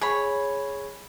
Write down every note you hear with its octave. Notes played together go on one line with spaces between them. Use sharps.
G#4 C#5 B5